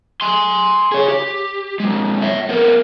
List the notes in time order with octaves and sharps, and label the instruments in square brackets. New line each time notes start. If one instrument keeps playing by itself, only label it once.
[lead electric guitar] G#5 C6
G#4 C#5
G4
F2 G#3
C#5 E5
B3 A#4